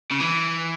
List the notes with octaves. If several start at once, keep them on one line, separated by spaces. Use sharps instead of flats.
C#3
E3